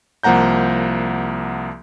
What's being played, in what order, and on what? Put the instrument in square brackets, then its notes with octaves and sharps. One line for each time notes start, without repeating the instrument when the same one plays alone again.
[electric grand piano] C2 F3 A#3 F#5 A#5 G6